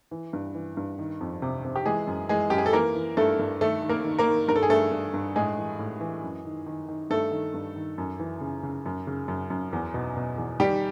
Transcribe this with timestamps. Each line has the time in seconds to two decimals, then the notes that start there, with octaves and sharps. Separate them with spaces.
0.11 E3
0.33 G2
0.55 E3
0.77 G2
0.99 D#3
1.21 F2
1.42 C3
1.65 C3
1.76 G4
1.86 E3 G#3 G#4
2.07 F#2
2.29 E3 G#3 G#4
2.50 F#2 G4
2.58 G#4
2.66 A4
2.73 E3 A#3 A#4
2.95 E3
3.17 G2 A3 A4
3.39 G2
3.61 D#3 A3 A4
3.82 D#3
3.89 A#3 A#4
4.05 D#3
4.19 A#3 A#4
4.27 D#3
4.48 G2 A#4
4.56 A4
4.63 G#4
4.69 G2 A3 A4
4.91 G2
5.14 G2
5.36 A2 G#3 G#4
5.57 E3
5.79 A2
6.01 E3
6.23 F#2
6.45 D#3
6.66 D#3
6.88 D#3
7.10 G2 A3 A4
7.32 D#3
7.54 G2
7.76 D#3
7.98 F#2
8.20 E3
8.41 C#3
8.63 C#3
8.86 F#2
9.07 C#3
9.28 F#2
9.50 F#2
9.73 E2
9.94 B2
10.17 B2
10.38 E2
10.60 D#3 G3 G4